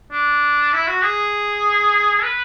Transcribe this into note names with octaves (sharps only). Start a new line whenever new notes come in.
D4
E4
F#4
G#4
B4